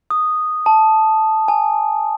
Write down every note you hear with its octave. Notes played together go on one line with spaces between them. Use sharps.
D#6
A5
G#5